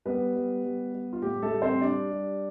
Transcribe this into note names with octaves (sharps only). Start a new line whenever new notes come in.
G3 B3 B4
G3
G3
G3
F4
A2 G4
A3 A4
G3
C4 C5
G3 D4 D5
G3